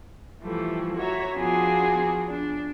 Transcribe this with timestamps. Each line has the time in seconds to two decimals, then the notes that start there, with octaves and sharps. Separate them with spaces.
0.42 E3 F3 G3 A3
0.97 F#4 C#5 E5 A#5
1.36 F3 B3 D4 F4 F#4 G#4
2.29 D4